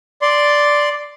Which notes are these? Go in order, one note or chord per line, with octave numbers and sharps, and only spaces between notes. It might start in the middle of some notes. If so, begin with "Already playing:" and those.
D5 C6